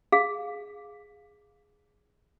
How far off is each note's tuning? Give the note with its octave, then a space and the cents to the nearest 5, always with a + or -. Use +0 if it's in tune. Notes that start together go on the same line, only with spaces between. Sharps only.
G#4 +0 F5 +10